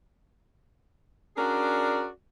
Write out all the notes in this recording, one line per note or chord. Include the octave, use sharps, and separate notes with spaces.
C#4 D4 F#4 G#4 A#4 D5